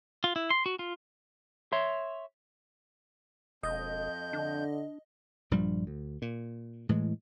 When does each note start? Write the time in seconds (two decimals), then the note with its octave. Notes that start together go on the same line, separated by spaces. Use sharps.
0.24 F4
0.36 E4
0.50 C6
0.66 F#4
0.79 F4
1.72 C#5 E5 C6
3.63 E1 F2 D#5 G6
4.33 D3 D4
5.51 A#1 G2 F3 G3
5.87 D2
6.22 A#2
6.89 A2 E3 G#3